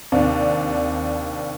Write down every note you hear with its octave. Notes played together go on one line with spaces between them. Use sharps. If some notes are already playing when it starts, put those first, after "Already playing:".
D#2 C3 D4